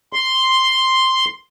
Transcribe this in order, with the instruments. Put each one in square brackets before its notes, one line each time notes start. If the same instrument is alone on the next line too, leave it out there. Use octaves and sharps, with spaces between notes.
[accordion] C6